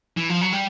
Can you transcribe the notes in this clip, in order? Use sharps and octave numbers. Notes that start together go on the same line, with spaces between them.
E3
F3
F#3
G3